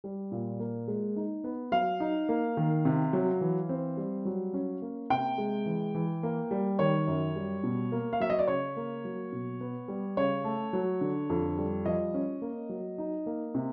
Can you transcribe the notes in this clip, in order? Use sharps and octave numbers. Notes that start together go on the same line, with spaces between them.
G3
A#2
A#3
G#3
D#4
B3
F#3 F5
D#4
A#3
D#3
C3
F#3
E3
C4
G3
F#3
C#4
A#3
C3 G5
G#3
E3
E3
A#3
G3
D#3 C#5
F#2
G3
B2
A#3
F5
F#3 E5
D#5
D5
C#3 C#5
A#3
F#3
B2
B3
G3
C#3 C#5
A3
F#3
D3
F2
G3
F3 D#5
C#4
A#3
F#3
D#4
A#3
C3